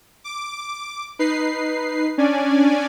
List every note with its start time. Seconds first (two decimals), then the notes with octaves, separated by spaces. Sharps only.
0.24 D6
1.19 D#4 B4 C7
2.18 C#4 D4 D5 G#5